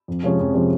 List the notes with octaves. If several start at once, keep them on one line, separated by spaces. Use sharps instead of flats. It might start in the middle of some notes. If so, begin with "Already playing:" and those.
F2
C3 F3 G#3 C#4
F2
C3 F3 G#3 C#4